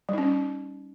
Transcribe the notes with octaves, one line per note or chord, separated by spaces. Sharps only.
G3 C#4 D#4